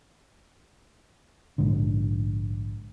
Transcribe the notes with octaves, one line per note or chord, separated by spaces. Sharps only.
A#1 G#2 D3